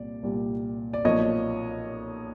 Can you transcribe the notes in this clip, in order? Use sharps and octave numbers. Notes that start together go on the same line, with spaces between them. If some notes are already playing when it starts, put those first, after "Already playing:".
Already playing: C2 A#2 G3 D5
C2 A#2 G3
D5
B1 A#2 F3 A#3 C#5 D#5